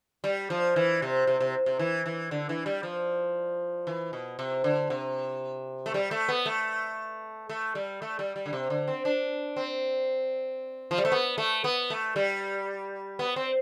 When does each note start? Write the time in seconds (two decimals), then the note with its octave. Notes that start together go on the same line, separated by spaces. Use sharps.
0.24 G3
0.50 F3
0.76 E3
1.02 C3
1.27 C3
1.40 C3
1.66 C3
1.79 E3
2.06 E3
2.31 D3
2.49 E3
2.66 G3
2.83 F3
3.87 E3
4.13 B2
4.39 C3
4.64 D3
4.90 C3
5.86 A3
5.94 G3
6.11 A3
6.29 B3
6.46 A3
7.49 A3
7.75 G3
8.02 A3
8.19 G3
8.36 G3
8.46 D3
8.53 C3
8.70 D3
8.88 C4
9.05 D4
9.56 C4
10.91 F3
10.98 G3
11.05 A3
11.12 B3
11.38 A3
11.64 B3
11.90 A3
12.16 G3
13.19 B3
13.36 C4